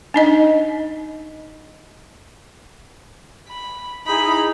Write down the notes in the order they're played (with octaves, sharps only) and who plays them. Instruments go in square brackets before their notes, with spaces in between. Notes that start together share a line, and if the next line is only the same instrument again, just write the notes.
[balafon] D4 D#4 D#5
[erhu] B5
[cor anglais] D#4 [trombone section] E4 G#4 [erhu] B5